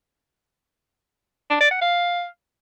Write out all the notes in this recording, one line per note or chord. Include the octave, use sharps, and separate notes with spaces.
D4
D5
F#5
F5